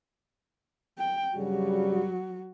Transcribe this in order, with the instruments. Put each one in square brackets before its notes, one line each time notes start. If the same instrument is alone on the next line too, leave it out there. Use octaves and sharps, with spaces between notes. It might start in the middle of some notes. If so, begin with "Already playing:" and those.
[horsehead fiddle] G5
[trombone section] G2 C#3 G3 [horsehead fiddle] F#3 F#4